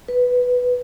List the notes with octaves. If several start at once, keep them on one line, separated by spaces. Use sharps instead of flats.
B4